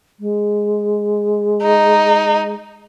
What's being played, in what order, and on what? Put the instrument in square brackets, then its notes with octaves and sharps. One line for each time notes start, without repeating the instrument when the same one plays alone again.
[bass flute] G#3
[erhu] D#4